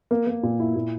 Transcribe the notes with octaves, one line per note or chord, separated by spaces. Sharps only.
A#3
A#3
A#2
E4
A#2